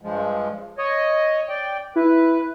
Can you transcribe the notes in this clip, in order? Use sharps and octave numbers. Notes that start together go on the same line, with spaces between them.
G2 F3 G#3
C#5 D#5
D5 G5
E4 B4